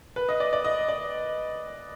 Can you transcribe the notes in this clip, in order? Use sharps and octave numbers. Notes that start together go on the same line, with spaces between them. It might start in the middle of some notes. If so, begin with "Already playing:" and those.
B4
D#5
D5
D5
D#5
D5